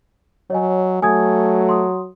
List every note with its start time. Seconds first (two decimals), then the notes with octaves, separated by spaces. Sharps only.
0.50 F#3 C#5 D#5 G#5
1.02 F#3 A3 G#5 D#6 G#6
1.69 C6 D#6